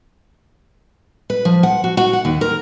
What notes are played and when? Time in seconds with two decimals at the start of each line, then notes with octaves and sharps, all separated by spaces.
1.30 B4
1.45 F3
1.63 F#5
1.84 F#4
1.97 F#4
2.13 F#5
2.25 D#2
2.41 A#4